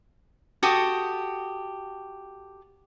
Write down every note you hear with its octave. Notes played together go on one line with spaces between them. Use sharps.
F#4 G4 A4 D#6